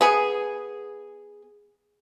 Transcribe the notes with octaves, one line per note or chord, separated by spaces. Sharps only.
B3 G#4